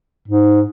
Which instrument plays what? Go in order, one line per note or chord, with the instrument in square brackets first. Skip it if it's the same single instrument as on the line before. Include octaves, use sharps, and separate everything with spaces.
[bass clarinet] G#2